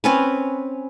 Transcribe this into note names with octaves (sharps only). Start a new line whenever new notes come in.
C4 C#4 B4